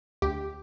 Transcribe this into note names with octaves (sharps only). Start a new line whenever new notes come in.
D2 G4